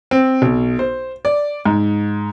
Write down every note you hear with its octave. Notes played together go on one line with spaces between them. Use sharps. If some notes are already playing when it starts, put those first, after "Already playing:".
C4
B1
C5
D5
G#2